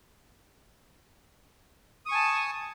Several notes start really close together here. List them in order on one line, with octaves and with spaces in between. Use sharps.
D#6 C#6 G#5 A5